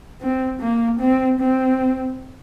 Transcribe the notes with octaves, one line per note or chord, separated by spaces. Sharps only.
C4
A#3
C4
C4